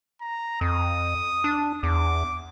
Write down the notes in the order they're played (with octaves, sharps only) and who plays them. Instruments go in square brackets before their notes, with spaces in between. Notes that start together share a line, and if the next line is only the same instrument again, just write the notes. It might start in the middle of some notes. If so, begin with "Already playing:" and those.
[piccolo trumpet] A#5
[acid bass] F2 [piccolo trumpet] D#6
[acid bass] D4
[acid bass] E2 [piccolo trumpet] D6